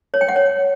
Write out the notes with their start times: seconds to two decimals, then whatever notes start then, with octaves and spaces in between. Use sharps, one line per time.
0.14 C#5
0.21 G5
0.28 F#5
0.36 C#5